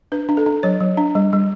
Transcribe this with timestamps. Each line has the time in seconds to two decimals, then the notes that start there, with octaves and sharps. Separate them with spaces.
0.12 D4 B4
0.29 D4
0.37 A4
0.46 D4
0.63 F#3 C#5
0.80 F#3
0.97 D4
1.15 G3
1.33 G3